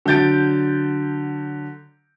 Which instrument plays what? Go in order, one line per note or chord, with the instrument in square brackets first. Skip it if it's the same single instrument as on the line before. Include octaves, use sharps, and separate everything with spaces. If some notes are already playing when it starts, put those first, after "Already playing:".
[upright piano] D3 F#3 G6 A6 D7